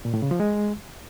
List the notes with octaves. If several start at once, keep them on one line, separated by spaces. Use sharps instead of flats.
A#2
A2
C#3
F3
G#3